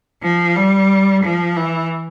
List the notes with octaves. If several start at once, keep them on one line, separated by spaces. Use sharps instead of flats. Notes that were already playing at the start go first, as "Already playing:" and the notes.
F3
G3
F3
E3